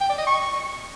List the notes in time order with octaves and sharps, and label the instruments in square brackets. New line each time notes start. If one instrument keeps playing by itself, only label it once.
[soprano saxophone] G5
D5
D#5
C#6